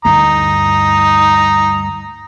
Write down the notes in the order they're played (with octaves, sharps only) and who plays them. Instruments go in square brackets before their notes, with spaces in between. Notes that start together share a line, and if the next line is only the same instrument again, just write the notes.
[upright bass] D2 G2 [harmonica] A#5 D#6